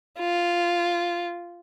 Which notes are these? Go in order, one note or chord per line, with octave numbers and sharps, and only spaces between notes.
F4